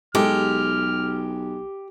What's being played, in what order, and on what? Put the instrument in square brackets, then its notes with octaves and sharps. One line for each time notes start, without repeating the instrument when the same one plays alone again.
[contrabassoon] B1 [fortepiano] G#3 A4 D6 [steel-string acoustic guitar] G4 [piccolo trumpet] F6